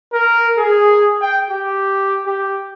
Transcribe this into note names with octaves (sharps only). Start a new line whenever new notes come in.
A#4
G#4
G5
G4
G4